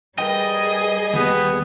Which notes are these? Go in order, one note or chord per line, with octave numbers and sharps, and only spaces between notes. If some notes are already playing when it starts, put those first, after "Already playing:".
G3 G#4 A#4 B4 D#5 G5
D#2 B3 G4